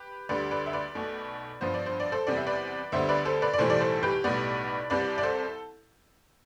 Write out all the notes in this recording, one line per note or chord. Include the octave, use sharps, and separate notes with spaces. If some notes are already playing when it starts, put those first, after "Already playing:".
Already playing: G4 B4
D2 D3 G3 B4 D5
B4 D5
E5
B4 D5
B1 B2 A3
G2 F3 B3 C5
D5
C5
D5
A4 C5
E2 C3 G3 B3 D5
E5
B4 D5
D2 D3 G3 B3 C5 E5
B4 D5
A4 C5
B4 D5
D5
B1 A2 E3 G3 A4 C5
D5
A4 C5
G4 B4
B1 A2 G3 B3 B4 D5
C2 C3 G3 B4 D5
D5
A4 C5